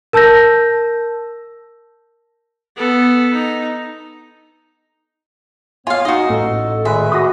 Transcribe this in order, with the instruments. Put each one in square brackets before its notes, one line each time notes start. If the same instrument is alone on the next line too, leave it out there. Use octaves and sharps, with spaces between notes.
[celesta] A#4 A5 E6 G6 A#6
[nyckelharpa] B3 A4
D#4
[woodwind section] A2 B3 C#5 [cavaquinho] F4 F5 [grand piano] G#5
[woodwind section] D#4 [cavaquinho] F#4 D#5
[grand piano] A1 [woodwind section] A4
[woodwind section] A#2 D#3 [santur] G#3 B4 [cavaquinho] E5
[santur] F#4 B4 C6 [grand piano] D#6 A#6